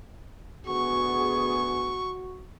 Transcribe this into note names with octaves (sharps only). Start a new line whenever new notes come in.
D2 B3 F#4 G#4 C#6